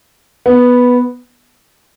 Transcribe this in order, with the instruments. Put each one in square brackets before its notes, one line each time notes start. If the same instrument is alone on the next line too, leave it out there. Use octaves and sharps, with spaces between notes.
[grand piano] B3